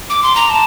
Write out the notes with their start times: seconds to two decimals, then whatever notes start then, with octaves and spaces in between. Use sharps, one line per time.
0.10 D6
0.23 C6
0.36 A#5
0.50 A5